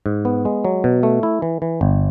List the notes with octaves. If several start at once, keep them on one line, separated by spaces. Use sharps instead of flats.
G#2
B3
G#3
F#3
B2
A3
E4
E3
E3
G1